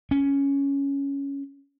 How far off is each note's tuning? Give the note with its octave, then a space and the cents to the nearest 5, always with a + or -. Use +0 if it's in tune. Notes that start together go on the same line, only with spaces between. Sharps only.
C#4 +5